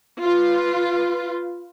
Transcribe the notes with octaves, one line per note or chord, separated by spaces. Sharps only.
F4 B4